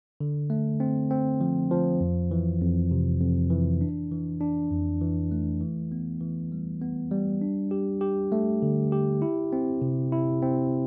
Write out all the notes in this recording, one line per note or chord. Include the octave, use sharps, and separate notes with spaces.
D3
A3
C4
C4
F3
F3
F2
E3
F2
C3
F2
E3
D4
E3
D4
F2
E3
A3
E3
B3
E3
G3
B3
G3
D4
G4
G4
A3
D3
G4
E4
C4
C3
E4
C4